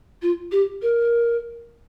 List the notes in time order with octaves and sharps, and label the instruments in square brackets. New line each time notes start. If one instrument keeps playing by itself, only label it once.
[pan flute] F4
G4
A#4